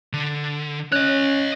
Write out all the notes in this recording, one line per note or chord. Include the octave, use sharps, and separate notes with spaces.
D3
C#4 C#5 D#5 F#6